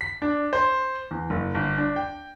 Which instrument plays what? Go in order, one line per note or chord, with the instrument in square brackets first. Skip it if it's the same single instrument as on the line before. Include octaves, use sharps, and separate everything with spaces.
[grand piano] B6
D4
C5
E2
F#1
G1
D4
G5